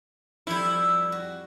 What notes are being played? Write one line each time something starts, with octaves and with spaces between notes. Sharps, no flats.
F2 G3 E4
F#4